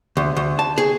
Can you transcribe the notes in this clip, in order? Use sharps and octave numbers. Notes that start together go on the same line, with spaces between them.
D2
D2
A5
G#4